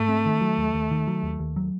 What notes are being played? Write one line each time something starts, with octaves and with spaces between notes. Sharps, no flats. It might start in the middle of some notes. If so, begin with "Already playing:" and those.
Already playing: G#2 A3
C4
D#3
F#3
D#2
D#2
D#3
F#3
D#2
D#2
F#3